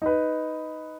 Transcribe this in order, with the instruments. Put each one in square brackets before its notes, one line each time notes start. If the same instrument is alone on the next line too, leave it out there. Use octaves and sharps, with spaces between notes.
[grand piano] D#4 B4